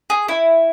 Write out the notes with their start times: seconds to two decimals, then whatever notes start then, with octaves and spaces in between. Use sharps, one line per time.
0.10 G#4
0.28 E4